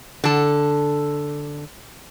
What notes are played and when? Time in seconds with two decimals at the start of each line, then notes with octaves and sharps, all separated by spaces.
0.24 D3 A4